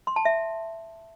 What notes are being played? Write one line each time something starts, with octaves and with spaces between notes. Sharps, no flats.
C6
A5
E5